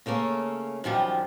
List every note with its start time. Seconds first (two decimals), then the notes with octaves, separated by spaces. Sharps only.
0.06 C#3 A3 A#3 C#4
0.84 F#2 D#3 F3 G3